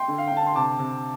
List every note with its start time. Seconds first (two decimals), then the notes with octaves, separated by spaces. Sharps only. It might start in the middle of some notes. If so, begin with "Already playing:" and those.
Already playing: G5 C6
0.08 D3
0.18 F5
0.28 D3 G5
0.37 A5
0.46 C6
0.56 C3 A5 D6
0.79 C3